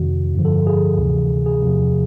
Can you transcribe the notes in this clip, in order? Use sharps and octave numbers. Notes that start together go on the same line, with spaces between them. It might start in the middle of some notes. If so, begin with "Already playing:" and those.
Already playing: F2 C3 D#3 F#4
G2 D3 F3
A4
G#4
D2 C3 E3
G#4
E2 C3 F3